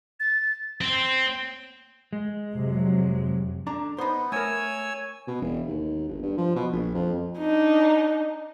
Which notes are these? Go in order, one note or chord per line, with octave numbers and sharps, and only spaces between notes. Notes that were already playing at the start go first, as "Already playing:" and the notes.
A6
C4
G#3
F2 C3 F#3
D3 D4 A#5
B3 D#4 C5
A3 A#4 C#5 G#5 E6
B2
E1
D#2
G1
G2
F3
B2
A#1
F2
D4 D#4